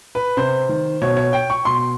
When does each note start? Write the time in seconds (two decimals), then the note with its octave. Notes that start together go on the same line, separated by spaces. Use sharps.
0.15 B4
0.37 C3 C5
0.69 D#3
1.01 B2 C#5
1.17 C#5
1.33 G5
1.50 C#6
1.65 B2 C6